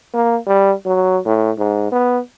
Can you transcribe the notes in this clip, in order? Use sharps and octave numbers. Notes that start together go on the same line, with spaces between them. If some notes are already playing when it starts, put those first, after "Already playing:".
A#3
G3
F#3
A2
G#2
B3